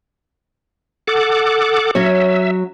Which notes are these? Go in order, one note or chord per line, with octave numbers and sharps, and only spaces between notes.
A4 F#5 D6
F#3 C#4 C#5 E5